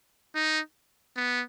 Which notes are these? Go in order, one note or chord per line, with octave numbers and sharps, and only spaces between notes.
D#4
B3